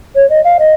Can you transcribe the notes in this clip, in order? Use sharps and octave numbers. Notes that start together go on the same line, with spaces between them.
C#5
D#5
F5
D#5